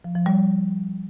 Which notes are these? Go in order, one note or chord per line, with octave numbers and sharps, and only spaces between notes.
F3
F3
G3